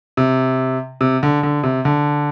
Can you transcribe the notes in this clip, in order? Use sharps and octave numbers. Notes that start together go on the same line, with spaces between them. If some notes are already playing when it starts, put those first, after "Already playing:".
C3
C3
D3
D3
C3
D3